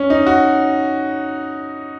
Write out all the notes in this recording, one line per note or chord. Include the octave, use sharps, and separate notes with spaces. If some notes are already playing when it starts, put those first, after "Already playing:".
Already playing: C#4
D#4
F#4